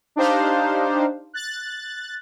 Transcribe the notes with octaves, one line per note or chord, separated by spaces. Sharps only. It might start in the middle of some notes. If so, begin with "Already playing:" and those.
D4 D#4 G4 C5 F5
F#6 A6